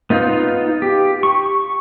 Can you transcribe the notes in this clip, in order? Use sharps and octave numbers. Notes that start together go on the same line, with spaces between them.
B3 D#4 F4
G4
C#6